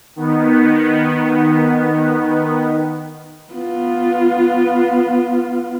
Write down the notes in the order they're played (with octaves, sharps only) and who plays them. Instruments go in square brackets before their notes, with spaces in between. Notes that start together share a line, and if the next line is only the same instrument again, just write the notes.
[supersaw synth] D#3 B3
[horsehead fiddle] B3 F4